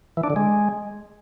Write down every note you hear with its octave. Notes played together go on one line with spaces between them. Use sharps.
E3
D4
D3
G#3